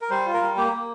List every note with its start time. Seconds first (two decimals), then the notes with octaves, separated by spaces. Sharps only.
0.01 A#4
0.10 G3 C5
0.26 F4
0.34 A#4
0.41 G3
0.57 A#3 G4
0.72 A#3